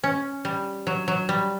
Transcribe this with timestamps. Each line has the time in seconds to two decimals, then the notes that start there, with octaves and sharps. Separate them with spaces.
0.04 C#4
0.45 G3
0.87 F#3
1.08 F#3
1.29 G3